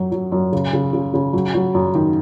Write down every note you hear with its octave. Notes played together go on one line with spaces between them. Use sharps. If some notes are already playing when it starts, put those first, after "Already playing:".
Already playing: F#2 F#3
F#3
F#2
C#3
C#3
C#3
C#3
F#3
F#3
F#2
D#3